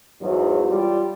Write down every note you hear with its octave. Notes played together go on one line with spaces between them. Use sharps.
E2 G#2 F#3
G3 F4 G4